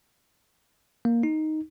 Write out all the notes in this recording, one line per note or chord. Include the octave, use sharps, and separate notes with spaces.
A#3
D#4